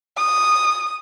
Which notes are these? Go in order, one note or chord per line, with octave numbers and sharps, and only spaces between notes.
D#6